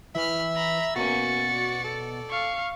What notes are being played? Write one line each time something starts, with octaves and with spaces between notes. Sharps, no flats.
E3 E5 B5 F6
A#5 B5
B2 A#3 C#4 F#4 A6 C#7
D5
A4
F5 C#6